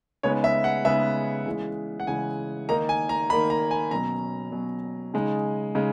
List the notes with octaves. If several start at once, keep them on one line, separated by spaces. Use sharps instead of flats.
C#3 G#3 B3 D#4 C#5
E5
F#5
C#3 G#3 B3 D#4 E5
C#3 E3 G#3
F#5
C#3 E3 G#3 G#5
D#3 A#3 D#4 A#5
G#5
A#5
D#3 A#3 D#4 B5
A#5
G#5
B2 F#3 C#4 A#5
B2 F#3 C#4
C#3 G#3 D#4
C#3 G#3 D#4